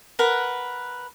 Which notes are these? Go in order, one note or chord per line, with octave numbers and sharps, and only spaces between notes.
A#4 B4 F#5